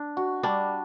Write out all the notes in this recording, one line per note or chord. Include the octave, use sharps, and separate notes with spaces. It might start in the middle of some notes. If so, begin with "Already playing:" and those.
Already playing: D4
F#4
G3 D4